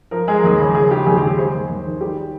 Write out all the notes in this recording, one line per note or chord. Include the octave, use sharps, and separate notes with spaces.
F3 A#4
G#3 G#4
A#4
D#2 G#4
C#3
F3 G#4
G#3 G4
D#2 G#4
C#3 G4
G#4
G#3 C5
D#2
D#2
D#3
G3 G4